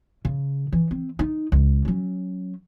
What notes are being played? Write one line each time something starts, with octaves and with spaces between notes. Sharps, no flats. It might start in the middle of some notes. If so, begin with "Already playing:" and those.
C#3
E3
C4
D#4
C#2
F#3 C#4